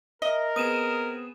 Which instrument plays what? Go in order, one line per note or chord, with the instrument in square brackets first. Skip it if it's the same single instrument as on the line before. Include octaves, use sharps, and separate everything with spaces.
[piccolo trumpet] A#4 [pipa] D#5 [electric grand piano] E5 D#6
[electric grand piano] B3 C4 G#4 [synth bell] D#6 D#7 E7